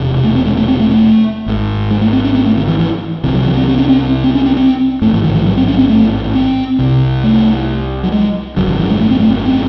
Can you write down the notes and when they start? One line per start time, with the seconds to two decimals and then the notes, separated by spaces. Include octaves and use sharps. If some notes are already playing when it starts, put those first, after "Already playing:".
Already playing: E1 E2 C3
0.24 A3
0.35 C4
0.47 G#3
0.57 A3
0.68 C4
0.80 A3
0.91 A3
1.46 G#1 G#2
1.91 G#3
2.01 A3
2.13 C4
2.24 C#4
2.35 C4
2.46 A3
2.57 D#3
2.68 E3
2.80 E3
3.24 C3 E3
3.27 C2
3.34 F#3
3.46 E3
3.57 C4
3.68 C4
3.78 C#4
3.88 C4
4.24 C4
4.35 C#4
4.46 C4
4.57 C4
5.02 G#2 A3
5.04 A1
5.13 E3
5.24 D#3
5.34 E3
5.46 F#3
5.57 C4
5.68 C#4
5.79 C4
5.90 A3
6.35 C4
6.79 C2 C3
7.23 A3
8.04 F#3
8.12 G#3
8.56 G#1 F#2 C#3 F#3
8.68 E3
8.79 E3
8.90 G#3
9.00 A3
9.11 C4
9.20 A3
9.45 C4